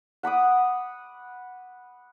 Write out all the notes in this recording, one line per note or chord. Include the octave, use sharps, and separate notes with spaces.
F#5 B5 D6 D#6